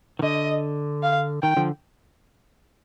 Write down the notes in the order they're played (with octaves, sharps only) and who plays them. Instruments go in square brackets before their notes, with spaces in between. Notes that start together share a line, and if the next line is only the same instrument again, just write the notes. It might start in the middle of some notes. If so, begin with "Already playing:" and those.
[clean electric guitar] D#3
[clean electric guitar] D3 [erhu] D#5
[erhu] F5
[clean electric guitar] D#3 [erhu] G5
[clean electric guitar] D3 F3